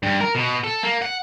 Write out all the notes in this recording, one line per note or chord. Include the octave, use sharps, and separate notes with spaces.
G2
A#4
B2
A4
A#3
F#5